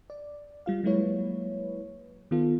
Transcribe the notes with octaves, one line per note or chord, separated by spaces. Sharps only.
D5
G3 F4 F5
F#3 G#3 A#3 E4 B4 C#5
D#3 B3 F4 A4